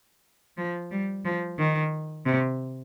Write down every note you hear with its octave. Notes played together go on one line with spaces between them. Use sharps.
F3
G3
F3
D#3
C3